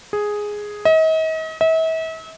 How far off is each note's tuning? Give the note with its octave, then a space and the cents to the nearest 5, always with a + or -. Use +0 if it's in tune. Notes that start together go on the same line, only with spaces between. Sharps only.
G#4 +0
D#5 +40
E5 -40